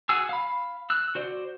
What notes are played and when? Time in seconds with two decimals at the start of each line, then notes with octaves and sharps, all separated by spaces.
0.09 F#4 G#4 G#5 E6
0.29 F5 B5
0.90 E6 F#6
1.15 F#4 C5 D5